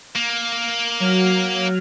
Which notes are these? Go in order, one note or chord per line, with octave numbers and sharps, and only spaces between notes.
A#3
F#3 F6